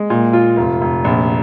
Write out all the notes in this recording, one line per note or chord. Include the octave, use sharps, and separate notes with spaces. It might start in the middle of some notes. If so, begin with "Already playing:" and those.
Already playing: G#3
A#2
F4
F1
F1
A#1